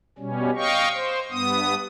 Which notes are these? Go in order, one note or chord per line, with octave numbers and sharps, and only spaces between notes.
B2 G3 C#4
D#5 F5 G5 C#6
C5
G2 B3 D#6